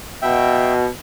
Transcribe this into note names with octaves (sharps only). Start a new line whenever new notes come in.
B2 E5 G5